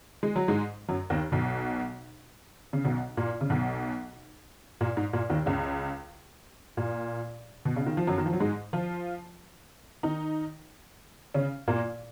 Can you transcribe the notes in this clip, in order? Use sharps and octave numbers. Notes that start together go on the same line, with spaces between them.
G#3
F#3
G#2 G#3
F#2 F#3
D#2 D#3
B1 B2
C#3
B1 B2
A#2
C#3
B1 B2
A#2
G#2
A#2
D#2 D#3
C#2 C#3
A#2
B2
C#3
D#3
F3
F#2 F#3
D#3
F3
F#3
G#2 G#3
F3 F4
D#3 D#4
C#3 C#4
A#2 A#3